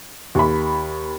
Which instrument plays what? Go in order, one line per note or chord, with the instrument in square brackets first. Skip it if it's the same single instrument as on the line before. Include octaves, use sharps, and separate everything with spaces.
[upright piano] D#2 B5